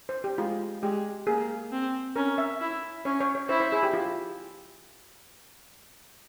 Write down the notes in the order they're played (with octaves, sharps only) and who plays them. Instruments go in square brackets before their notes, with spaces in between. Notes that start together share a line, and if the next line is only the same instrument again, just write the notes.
[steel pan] C5
G4
[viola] G#3 [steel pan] F4
[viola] G#3 [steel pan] G4
[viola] A#3 [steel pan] G#4
[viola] C4
[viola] C#4 [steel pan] A#4
[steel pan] E5
[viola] E4
[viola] C#4 [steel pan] C#5
[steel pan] C#5
C#5
[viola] E4 [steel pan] C5
[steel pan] C5
G#4
G4
F4